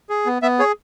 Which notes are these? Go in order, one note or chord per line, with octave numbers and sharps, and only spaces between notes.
G#4
B3
B3 E5
G#4 C#5